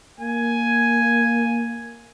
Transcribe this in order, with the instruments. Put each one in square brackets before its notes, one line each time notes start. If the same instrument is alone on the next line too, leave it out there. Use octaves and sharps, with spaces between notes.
[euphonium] A#3 [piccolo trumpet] G#5